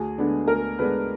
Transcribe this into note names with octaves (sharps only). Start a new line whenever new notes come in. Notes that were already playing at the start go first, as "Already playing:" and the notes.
Already playing: D2 G#4
D3 G#3 B3 D4
D2 A#4
D3 G#3 B3 D4 B4